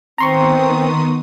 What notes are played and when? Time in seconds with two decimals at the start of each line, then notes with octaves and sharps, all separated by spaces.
0.18 D#3 B3 C4 A#5 C6 C#6 D#6